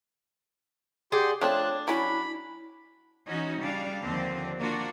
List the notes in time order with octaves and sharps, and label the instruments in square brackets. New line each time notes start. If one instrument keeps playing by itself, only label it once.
[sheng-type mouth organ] G4 C6 [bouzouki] G#4 D5 F#5
[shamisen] F3 A3 C4 [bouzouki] D4 [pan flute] C#5 [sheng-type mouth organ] A5 F#6
[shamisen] F#3 C#4 [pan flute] E4 [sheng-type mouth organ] B5
[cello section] E3 C#4 D#4 F#4
C#3 G3 D4 D5 F5
D#2 D3 F3 C4 D4
A#3 D4 F4 F#4